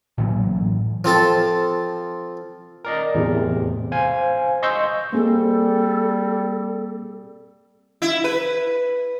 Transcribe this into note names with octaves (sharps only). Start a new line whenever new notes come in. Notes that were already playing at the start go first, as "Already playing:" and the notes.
A2 E3 F#3 A#3
F3 C4 A4 A5
A#4 D5 D#5
E2 A2 C3
C5 F5 G#5
D#5 C6 C#6 E6 G6
G3 A#3 C4 G#4 A4
E4
B4